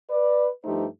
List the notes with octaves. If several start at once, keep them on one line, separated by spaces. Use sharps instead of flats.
B4 D5
G2 F3 A3 D#4 G4 C5